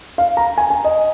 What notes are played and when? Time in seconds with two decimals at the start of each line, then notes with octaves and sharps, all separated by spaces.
0.18 F5
0.37 A#5
0.58 G#5
0.70 G#5
0.84 D#5